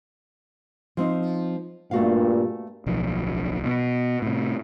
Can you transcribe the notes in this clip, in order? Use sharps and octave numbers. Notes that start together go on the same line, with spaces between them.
F3 C4 D#4
G2 A#2 A3 F#4 F5
D1 B1 F3
B2
A2 C3